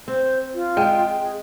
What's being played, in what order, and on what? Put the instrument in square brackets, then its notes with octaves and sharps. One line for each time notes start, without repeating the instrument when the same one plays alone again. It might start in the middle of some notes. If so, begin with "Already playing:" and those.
[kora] C4 [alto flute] C5
[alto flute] F4
[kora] G#3 [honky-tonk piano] G5
[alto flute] G#4